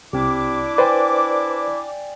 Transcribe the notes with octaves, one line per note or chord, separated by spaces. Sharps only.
C2 C4 D4 E4 G4 D6
B4 C5 D5 G5 G#5